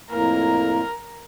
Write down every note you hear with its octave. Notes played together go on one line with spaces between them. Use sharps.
F2 A2 A#3 A#4